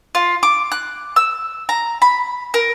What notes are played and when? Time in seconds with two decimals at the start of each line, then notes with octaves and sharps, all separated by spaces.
0.15 F4
0.43 D6
0.72 F#6
1.16 E6
1.69 A#5
2.02 B5
2.54 A#4